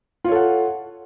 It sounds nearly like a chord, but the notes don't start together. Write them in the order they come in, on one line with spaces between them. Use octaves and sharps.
F4 C#5 A4 F#5